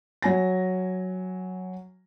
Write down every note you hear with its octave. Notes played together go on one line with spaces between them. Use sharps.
F#3 G#5 A#6